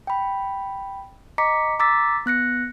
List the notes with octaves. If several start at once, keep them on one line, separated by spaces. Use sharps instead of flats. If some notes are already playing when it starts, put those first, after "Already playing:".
G5 B5
D#5 A#5 D6 B6 C#7
A#5 D6 E6 A6 B6
B3 F#6 A#6 C#7